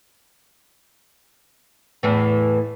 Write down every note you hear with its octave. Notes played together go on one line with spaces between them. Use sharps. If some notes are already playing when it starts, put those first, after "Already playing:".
E2 A2 E3